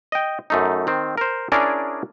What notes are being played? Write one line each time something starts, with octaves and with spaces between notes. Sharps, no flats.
D#5 G5
F#2 A3 D#4
D#3 C4
A#4 C5
C#4 D4 E4 G#4 A#4 D5